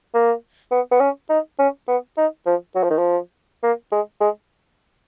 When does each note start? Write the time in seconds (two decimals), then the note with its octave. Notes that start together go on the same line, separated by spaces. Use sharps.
0.14 A#3
0.71 B3
0.91 B3
1.00 C#4
1.30 D#4
1.59 C#4
1.88 B3
2.17 D#4
2.46 F3
2.75 F#3
2.83 F3
2.90 D#3
2.98 F3
3.63 A#3
3.92 G#3
4.20 G#3